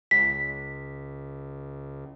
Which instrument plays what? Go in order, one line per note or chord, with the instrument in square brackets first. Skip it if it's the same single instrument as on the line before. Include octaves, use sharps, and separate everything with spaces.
[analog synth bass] C#2 [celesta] B6